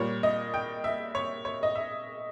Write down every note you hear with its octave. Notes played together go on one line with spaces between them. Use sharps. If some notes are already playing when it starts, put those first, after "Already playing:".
Already playing: A#2 G3 C#5
D#5
G5
E5
C#5
C#5
D#5
E5